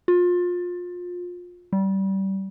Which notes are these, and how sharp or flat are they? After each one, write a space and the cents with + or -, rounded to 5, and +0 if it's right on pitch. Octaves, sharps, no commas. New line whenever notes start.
F4 +25
G3 -25